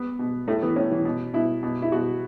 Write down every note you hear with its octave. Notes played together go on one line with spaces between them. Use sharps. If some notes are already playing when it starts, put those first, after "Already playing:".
Already playing: B3
B2
A2 A3
E3 B3
A2 C#4
E3
B2
B2 E4
B2
E4
B2 F#4